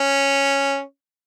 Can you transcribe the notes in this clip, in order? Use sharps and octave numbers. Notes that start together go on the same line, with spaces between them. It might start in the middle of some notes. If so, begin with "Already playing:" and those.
Already playing: C#4